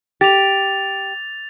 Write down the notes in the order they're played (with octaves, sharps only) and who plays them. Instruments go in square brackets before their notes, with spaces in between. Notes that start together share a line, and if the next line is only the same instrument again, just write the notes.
[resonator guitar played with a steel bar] G4 [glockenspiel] A6 F7